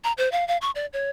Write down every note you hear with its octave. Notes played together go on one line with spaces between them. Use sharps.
A#5
C5
F5
F5
C#6
D5
C#5